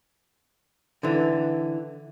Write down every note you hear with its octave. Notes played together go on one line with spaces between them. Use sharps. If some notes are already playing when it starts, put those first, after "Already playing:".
D3 E3